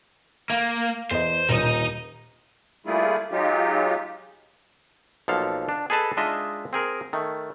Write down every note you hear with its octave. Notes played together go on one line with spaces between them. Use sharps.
A#3 F5
E2 C5 D#5
D#1 D#4 D#5 D#7
G3 A3 A#3 E4 F4 G#4
F#3 G#3 D#4 F4 G4
B1 F3 A#3 A4 F5
D4
G#4 A4 B4 D#5 A5
G#3 D4 D#4 F4 D#5 E5
C4 G#4 A#4
D#3 A3